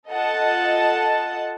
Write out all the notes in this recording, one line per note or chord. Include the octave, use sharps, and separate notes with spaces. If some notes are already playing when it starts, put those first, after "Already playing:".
F4 A4 D#5 F#5 A5